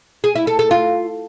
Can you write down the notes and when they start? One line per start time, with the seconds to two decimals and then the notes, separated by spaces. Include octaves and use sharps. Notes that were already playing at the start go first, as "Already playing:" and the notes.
0.24 G#4
0.35 E4
0.47 A4
0.59 A4
0.71 F4